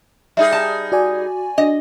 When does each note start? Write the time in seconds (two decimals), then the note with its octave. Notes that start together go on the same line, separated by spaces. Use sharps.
0.37 G3 D#4 G#4 E5
0.52 A5
0.92 F#4 D5 G#5
1.58 D4 D#5